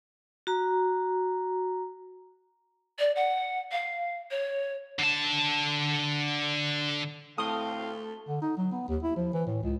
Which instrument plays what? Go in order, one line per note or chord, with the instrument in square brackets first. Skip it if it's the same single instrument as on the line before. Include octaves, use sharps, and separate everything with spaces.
[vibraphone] F#4 A#5
[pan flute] D5
F#5
F5
C#5
[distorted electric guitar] D3 A5
[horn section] A2 C4 F5 [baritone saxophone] A3 [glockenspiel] A5 G7 [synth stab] D#6
[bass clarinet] D3
D#4
F#3
B3
D#2
E4
F3
E3
A2
C#2